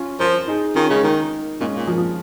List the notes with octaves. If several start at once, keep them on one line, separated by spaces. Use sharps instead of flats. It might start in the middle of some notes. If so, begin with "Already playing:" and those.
Already playing: C#4 F4
F3 F4 A#4
D#4 G#4
D#3 C#4 F4
C#3 G#3 C#4
D#3 A#3 D#4
A#2 G#3 C#4
A#2
F3 A#3
F3